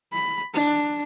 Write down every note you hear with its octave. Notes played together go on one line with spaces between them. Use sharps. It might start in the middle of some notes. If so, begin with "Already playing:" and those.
B5
D4